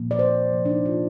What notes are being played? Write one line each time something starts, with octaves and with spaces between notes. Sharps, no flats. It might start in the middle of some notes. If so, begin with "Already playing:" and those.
Already playing: A#2 F3 A#3
D5
C5
C3 F3 A#3
D4
D#4
F4